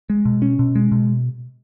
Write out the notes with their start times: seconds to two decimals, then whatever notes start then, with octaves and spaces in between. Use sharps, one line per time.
0.10 G#3
0.25 B2
0.42 C#4
0.59 B2
0.76 G#3
0.92 B2